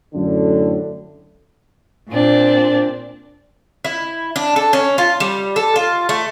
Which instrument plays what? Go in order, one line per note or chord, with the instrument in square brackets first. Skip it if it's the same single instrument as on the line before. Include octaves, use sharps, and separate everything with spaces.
[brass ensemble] F#2 A2 D3
[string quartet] A#2 C4 D4
[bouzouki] E4
D4
A4
C#4
F4
G3
A4
F4
A3